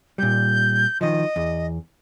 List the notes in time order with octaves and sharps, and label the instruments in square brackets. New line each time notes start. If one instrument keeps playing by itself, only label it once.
[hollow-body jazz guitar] A#2 G3 [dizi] G6
[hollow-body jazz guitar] D#3 F3 [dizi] D#5
[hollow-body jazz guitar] E2